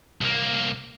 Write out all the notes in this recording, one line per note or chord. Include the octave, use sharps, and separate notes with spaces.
C2 A#3